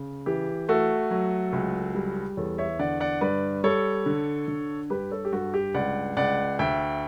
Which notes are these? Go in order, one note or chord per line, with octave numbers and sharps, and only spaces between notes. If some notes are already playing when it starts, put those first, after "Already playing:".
Already playing: C#3
E3 G4
A3 F#4 A4
F#3
C#2
G3
E2 A4 C#5
C#5 E5
D3 D5 F#5
D5 F#5
G2 B4 D5
G3 A4 C#5
D3
D3
G2 G4 B4
A4 C#5
G4
G2 F#4 A4
G4
C#2 D5 F#5
C#2 D5 F#5
D2 E5 G5